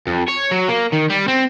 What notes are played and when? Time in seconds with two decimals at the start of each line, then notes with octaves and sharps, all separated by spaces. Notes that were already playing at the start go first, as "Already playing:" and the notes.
0.07 F2
0.28 C#5
0.51 F#3
0.68 A#3
0.92 D#3
1.10 G3
1.28 C4